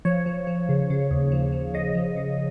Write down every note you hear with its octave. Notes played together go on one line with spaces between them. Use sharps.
F3 C#5
F3
F3
C#3
C#3
D#2
F3
F3
C#3 D#5
F3
C#3